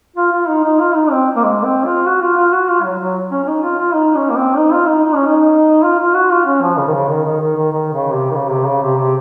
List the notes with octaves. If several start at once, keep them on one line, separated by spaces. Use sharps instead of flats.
F4
F4
D#4
D#4
F4
D#4
C4
A#3
G#3
C4
F4
F#4
F4
F4
F#4
F4
F#3
F#3
C#4
C#4
D#4
F4
F4
D#4
C#4
A#3
C4
D#4
F4
D#4
D#4
C#4
D#4
F4
F4
F#4
F4
C#4
F3
C#3
D#3
C#3
D#3
D#3
D#3
D#3
D#3
C#3
C3
D#3
C#3
C3
C#3
C3
C3